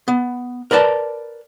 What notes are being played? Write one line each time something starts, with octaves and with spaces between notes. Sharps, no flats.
B3
A#4 B4 D5 A5